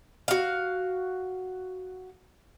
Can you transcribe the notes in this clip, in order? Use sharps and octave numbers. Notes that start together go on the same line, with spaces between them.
F#4 F5